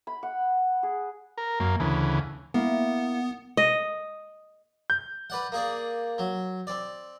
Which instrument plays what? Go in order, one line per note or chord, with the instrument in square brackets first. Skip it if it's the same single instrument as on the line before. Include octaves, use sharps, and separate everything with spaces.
[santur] B5
F#5
G#4
[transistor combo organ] A#4
F#2 A#3
D2 C#3 E3
[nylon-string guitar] A#3 E4 [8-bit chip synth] B3
[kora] D#5
[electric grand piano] G6
[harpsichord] B4 D5 F#5
A#3 G#4 D5
F#3
C4 D5